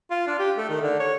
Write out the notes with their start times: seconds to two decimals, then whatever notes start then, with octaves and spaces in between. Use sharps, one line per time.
0.11 F4
0.27 D4
0.39 G4
0.57 A3
0.69 D#3
0.82 D3
1.00 C#5